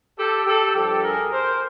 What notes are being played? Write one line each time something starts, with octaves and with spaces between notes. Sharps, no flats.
G4 A4
G4 A4
G2 D3 F3 G4 A4
G#4 A#4
A#4 C5